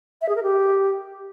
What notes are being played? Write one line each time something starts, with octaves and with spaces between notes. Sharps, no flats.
E5
G#4
A#4
G4